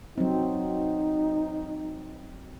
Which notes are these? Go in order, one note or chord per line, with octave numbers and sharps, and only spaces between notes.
F#3 C4 D#4